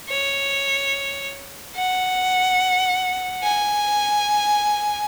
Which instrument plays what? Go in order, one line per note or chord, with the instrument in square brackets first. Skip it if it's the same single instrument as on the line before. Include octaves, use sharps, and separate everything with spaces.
[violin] C#5
F#5
G#5